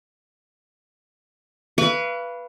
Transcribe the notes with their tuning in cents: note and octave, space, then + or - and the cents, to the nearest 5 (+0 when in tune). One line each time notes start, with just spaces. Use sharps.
B4 -5 F5 -30 C#6 +40